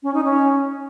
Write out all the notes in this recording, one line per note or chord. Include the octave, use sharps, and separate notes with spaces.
C#4
D#4
C#4